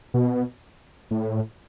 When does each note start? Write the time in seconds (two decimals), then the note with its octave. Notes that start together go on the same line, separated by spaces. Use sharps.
0.14 B2
1.11 A2